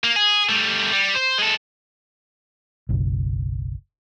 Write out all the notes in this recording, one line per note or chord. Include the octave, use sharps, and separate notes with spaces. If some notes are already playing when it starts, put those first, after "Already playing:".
A#3
G#4
G3 A3
G3
C5
G#3 A4
F#1 B1